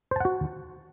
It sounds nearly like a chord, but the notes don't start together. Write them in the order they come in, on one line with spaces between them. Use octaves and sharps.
C5 A5 F#5 F#4